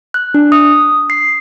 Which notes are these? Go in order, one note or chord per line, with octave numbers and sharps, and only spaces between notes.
F#6
D4
D#6
C7